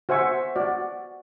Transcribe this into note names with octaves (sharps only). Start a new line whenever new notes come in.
F#4 C5 E5 G#5 C#6
F#4 D5